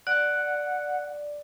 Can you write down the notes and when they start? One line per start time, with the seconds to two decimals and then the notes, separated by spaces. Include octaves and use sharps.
0.07 D5 F#5 F#6